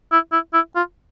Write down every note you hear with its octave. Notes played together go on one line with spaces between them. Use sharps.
E4
E4
E4
F4